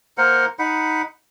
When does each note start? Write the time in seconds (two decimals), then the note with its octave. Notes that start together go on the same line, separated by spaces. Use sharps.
0.18 A#3 A#4 C5 F#5
0.59 D#4 F#5 B5